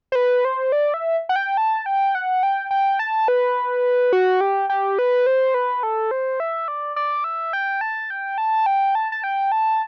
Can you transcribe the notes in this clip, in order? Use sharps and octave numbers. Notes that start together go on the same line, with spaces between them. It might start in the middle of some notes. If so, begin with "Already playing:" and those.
C5
B4
C5
D5
E5
F#5
G5
A5
G5
F#5
G5
G5
A5
B4
F#4
G4
G4
B4
C5
B4
A4
C5
E5
D5
D5
E5
G5
A5
G5
A5
G5
A5
A5
G5
A5